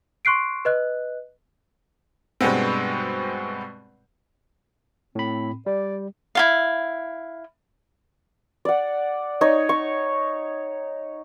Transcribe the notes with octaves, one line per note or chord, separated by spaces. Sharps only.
C6 C#6 F#6 C7 D7
B4 D#5 F#6
G2 B2 G#3 B3 C4
A2 C4 B5
G3 D5
E4 F4 F5
D5 F#5
D#4 C#5 D#5
C#6